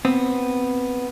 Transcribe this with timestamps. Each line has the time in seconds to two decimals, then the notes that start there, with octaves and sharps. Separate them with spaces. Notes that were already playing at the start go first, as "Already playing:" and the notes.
0.05 B3 C4